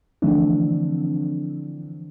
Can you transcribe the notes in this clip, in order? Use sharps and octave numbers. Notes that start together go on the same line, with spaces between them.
D3 E3 F3 A3 C4 D4